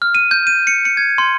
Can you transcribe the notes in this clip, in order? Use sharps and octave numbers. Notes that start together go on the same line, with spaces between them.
F6
D#7
G6
D#7
C#7
C#7
G#6
C6